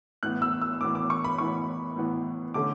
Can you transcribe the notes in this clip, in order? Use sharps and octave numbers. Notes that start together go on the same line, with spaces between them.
A2 E3 B3 F#6
E6
E6
A2 E3 B3 D6
D6
C#6
B5
A2 E3 B3 C#6
A2 E3 B3
D3 A3 C#4 D6